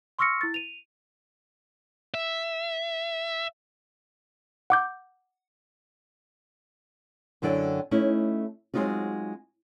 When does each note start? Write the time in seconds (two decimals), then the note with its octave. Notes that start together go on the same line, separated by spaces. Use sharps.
0.19 C6 C#6 E6 F6 A#6 C#7
0.41 E4 A6
0.54 D#7 F7
2.14 E5
4.70 F#5 D6 G6
7.42 F#2 D3 F#3 E4 D5 G5
7.91 A3 C#4 D#4 E4
8.74 F#3 G#3 C4 D#4 F4 F#4